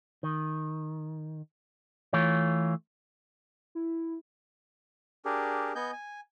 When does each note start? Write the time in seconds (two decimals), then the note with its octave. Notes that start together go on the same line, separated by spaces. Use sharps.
0.23 D#3
2.13 E3 A3 F4 C#5
3.75 E4
5.25 D4 G4 G#4 A#4
5.75 B3 D#5 G#5 G6
5.92 G#5